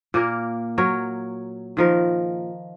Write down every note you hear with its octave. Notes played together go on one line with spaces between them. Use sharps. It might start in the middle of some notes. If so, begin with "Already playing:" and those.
A#2 A#3 A#4
F#3 A#4 C#5
D#3 F3 A#4